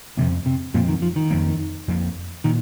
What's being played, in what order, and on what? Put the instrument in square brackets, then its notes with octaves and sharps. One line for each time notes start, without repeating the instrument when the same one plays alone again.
[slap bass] F2 F3 G#3 C4 [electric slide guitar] C3
[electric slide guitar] C3
[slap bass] F2 F3 G#3 C4 [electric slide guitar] A#2
[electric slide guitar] D#3
F3
D#3
[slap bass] F2 F3 A#3
F2 F3 A#3
[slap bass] A#2 [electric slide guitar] D#3